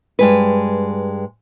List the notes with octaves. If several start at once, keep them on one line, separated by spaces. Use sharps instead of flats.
G2 G#3 B4